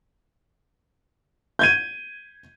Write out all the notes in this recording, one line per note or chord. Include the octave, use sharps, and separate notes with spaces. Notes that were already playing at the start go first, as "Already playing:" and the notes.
G6 G#6 D#7